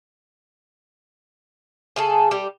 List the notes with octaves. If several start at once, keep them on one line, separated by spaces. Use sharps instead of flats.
C#3 G#4 A4
G3 G4